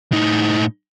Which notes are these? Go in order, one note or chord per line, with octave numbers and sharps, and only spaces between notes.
A2 D#4